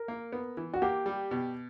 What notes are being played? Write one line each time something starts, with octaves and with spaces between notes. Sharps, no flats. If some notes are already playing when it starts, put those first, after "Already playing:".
Already playing: A#4
A#3
B3
E3
F#4
A#3 G4
G3
B2